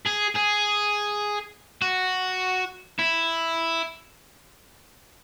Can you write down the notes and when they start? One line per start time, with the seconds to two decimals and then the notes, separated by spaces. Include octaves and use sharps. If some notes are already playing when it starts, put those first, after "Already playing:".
0.06 G#4
0.35 G#4
1.82 F#4
2.99 E4